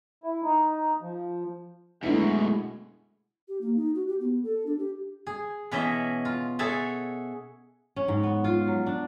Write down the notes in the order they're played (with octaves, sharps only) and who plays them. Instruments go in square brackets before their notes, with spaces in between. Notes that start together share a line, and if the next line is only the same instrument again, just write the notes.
[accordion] E4
D#4
F3
[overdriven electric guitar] F#2 B2 [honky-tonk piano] D3 E4 [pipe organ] G#3 A3 G#4
[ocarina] G4
A#3
D#4
F#4
G4
B3
A4
D4
G4
[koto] G#4
B2 E3 C#4 C#5 D#5 E5
F4
G#4 A4 C#5 E5 F#5 A5
[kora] C#4
G#2
B3
F4
F#3
D4